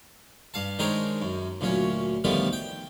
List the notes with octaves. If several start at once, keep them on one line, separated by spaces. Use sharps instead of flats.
G2 F5 A5
D#3 G#3 D4 A#4 C5 C#5
F#2
D2 A#2 F#3 C#4
A2 D3 D#3 F3 G3 B3
G5